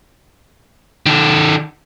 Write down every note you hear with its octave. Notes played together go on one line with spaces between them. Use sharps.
D#3 A4